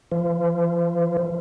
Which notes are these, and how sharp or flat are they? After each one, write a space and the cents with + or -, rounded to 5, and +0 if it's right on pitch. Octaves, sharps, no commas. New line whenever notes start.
F3 -35